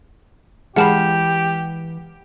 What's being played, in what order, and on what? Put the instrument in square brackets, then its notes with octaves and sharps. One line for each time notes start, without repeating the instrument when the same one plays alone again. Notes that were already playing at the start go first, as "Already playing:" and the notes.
[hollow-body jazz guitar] E3 [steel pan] G#3 G#4 F5 [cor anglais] G4 [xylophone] F#5 A5 B5